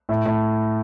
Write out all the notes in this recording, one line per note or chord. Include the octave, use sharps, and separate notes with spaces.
A2
A2